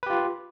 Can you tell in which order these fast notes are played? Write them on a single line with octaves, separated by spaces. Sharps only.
B4 G4 F4